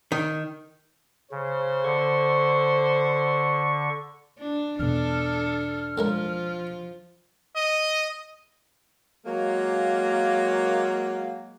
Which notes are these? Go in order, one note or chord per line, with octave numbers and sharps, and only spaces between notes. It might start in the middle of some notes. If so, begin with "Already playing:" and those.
D#3
C#3 C5
D3 C#6
D4
E2 B2 D4 A4 F6
A2 F3 G#3 F4 A#4
D#5
F#3 G#3 A#3